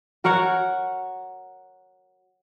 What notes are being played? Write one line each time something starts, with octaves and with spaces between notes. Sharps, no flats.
F#4 A#4 C#5 F#5